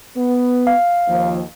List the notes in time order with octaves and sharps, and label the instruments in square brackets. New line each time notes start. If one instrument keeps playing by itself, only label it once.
[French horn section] B3
[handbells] F5
[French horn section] D#2 F3